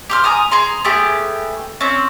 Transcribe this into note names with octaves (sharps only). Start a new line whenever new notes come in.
G4 C6 F6
G#5 A#5 D#6
G#4 A#5 C6
A3 B3 G4 G#4
C4 C#4